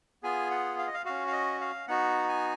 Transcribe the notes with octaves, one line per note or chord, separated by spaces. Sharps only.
B3 F4 G#4 G#5
F#5
F5
D#5
F5
C#4 F#4 F5
F5
D#5
F5
B3 D#4 F#4 F#5
G#5